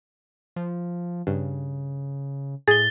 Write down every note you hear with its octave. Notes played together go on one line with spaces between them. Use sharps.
F3
G2 C#3
A2 G#4 A6 G7